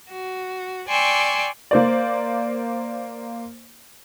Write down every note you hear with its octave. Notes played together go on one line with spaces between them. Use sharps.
F#4
D5 G5 G#5 C6 C#6 E6
A#3 C5 D5